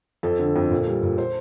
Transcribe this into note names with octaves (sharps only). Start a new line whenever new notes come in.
F2 A4
D3
F2
A#2
G3
A#2
C5